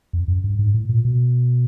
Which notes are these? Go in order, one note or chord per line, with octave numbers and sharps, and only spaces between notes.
F2
F#2
G2
G#2
A2
A#2
B2